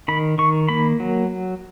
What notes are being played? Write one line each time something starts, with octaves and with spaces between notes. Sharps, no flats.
D#3 B5
D#3 C#6
A#3 B5
F#3